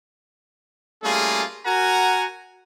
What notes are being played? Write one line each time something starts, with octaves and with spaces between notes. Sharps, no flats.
G3 A3 A#3 C#4 F4 G#4
F#4 A#4 F#5 G#5 A#5